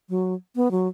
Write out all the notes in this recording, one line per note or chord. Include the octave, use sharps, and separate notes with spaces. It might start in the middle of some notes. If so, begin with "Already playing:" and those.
F#3
B3
F#3